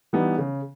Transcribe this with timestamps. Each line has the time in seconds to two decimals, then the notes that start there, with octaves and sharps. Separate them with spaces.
0.13 E3 G3 B3 D#4
0.38 C#3